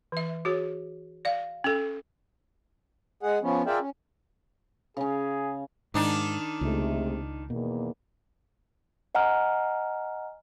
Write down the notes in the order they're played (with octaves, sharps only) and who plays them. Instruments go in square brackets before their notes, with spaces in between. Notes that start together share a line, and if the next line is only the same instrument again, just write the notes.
[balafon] E3 E5
F#4 G#4 C#5
D5 F5
C#4 A4
[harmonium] G#3 G#4 F#5
F3 B3 C#4
F4 G#4 A#4 D5 E5 G5
C#4
[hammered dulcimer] C#3 C#4 [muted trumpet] G#4
[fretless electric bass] G#2 [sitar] D#3 D4 D#4
[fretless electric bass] C#2 [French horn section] C3 G#3 A3
[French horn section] E2 D#3 A#3 [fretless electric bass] B2
[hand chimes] D#5 F#5 G#5 A#5 F6